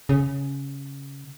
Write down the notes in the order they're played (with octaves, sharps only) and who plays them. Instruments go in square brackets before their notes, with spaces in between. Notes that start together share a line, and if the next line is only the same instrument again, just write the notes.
[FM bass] C#3